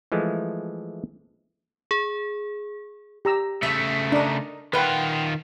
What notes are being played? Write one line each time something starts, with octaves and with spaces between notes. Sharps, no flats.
E3 F3 G#3 A3
G#4
G4 A#5 E6
C#3 A3 E5
D4 D#4 A#4
D#3 F4 B4 F#5 G5